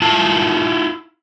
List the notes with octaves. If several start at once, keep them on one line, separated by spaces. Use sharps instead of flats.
E4 F4 A5